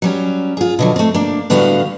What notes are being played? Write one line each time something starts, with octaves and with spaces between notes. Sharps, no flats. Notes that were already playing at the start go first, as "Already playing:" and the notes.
F#3 G3 C#4
F4 G#4
B2 D3 F#3
A3 C4
A#3 D4
A2 D3 G3 B3 F#4 F5